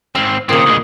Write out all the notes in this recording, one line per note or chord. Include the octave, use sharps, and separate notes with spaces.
G#2 C4 C5 F5
A#2 C#3 A#3 C4 D#6
D2 G#3 F#5